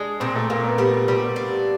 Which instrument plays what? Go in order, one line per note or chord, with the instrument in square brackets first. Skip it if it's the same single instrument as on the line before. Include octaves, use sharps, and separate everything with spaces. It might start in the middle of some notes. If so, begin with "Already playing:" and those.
Already playing: [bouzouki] G#3 [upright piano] D4
[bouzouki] A#2 [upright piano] C4
[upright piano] A3
[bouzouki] A#2 [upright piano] A#3
[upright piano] B3
[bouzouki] G3 [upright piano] B3
[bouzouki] G3
D4